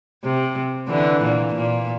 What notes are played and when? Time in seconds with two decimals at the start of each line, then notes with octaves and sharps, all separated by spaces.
0.24 C3
0.88 D3 E3
1.22 A#2
1.54 A#2